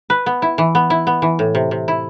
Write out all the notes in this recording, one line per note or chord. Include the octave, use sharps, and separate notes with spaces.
B4
B3
E4
E3
B3
E4
B3
E3
A2
C3
C3
E4